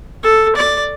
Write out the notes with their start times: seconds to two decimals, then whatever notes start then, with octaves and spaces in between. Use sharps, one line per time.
0.23 A4
0.56 D5